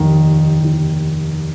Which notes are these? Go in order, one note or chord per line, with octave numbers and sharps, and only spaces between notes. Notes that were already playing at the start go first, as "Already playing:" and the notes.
Already playing: F1 D#2 D#3
F1 D#2 D#3